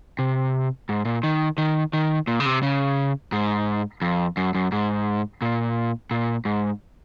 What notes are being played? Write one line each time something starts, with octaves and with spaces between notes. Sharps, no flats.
C3
G#2
A#2
D#3
D#3
D#3
A#2
C#3
C3
C#3
G#2
F2
F#2
F#2
G#2
A#2
A#2
G#2